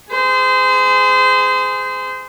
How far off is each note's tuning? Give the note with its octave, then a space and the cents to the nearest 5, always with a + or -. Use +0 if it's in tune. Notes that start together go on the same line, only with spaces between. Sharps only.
G#4 +0 C5 -30